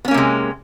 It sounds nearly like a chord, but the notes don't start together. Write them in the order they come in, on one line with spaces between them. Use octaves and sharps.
B3 C#4 A#3 C3 G#3